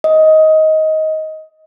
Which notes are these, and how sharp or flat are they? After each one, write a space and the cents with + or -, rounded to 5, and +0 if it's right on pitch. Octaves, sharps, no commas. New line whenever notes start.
D#5 +15